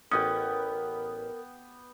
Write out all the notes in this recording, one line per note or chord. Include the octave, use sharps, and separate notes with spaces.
A1 B3 C#4 G4 A#4 D#6